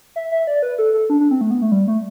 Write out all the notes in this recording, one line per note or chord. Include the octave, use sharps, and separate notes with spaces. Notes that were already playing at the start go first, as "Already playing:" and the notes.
E5
E5
D5
B4
A4
A4
D4
D4
C4
A3
B3
A3
G3
A3